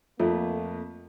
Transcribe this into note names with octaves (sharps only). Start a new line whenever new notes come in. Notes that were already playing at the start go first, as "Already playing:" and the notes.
F2 A3 A#3 F4